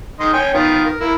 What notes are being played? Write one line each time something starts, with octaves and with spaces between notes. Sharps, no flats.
D#3 D#5 C6
C#5 G5 G#5
D#3 B3 F4
A#4
A#3 E4